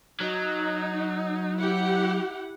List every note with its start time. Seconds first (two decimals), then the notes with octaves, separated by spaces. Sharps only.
0.20 F#3 D#4
1.60 E4 G4 F#5